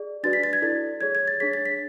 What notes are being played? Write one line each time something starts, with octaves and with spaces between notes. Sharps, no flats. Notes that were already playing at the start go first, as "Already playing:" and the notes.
Already playing: G#4 D5
D4 F#4 B4 D5 A6
B6
A6
G#6
E4 A4 D5
G#4 C#5 G#6
G#6
A6
D4 G#4 C#5 B6
A6
B6